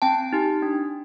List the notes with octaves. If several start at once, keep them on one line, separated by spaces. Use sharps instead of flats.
C4 G5 A5
D#4 G4
D4